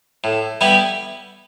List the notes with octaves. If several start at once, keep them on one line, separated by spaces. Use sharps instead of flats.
A2
G3 B3 E4 G4